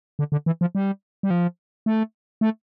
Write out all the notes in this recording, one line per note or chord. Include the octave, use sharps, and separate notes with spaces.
D3
D3
E3
F3
G3
G3
F3
A3
A3